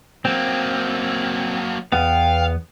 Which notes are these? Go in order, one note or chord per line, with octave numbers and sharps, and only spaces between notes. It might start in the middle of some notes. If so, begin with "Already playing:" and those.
F#3 A#3 C4
E2 B3 F5 G5